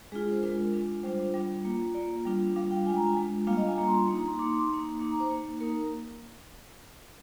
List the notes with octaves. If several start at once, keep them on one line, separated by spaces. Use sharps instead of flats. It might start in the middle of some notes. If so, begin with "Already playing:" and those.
G#3 D4 F4 G#4
G#4
C5
G#3 D4 F4 A#4
G#3 D4 F4
G3 D4 F4 C5
G3 D4 F4
A#3 F4
A#3 F4 D5
G3 D4 F4
G3 D4 F4 F5
G5
G#3 D4 F4 G#5
A#5
G#5
G#3 D4 F4
G3 A#3 D4 F4 F5
D#5
G#5
G3 A#3 D4 F4 A#5
C6
A#3 D#4
A#5
C6
A#3 D#4 D6
C6
C6
A#3 D#4
A#3 D#4 D6
A#5
C5
A#3 D#4
A#3 D#4 A#4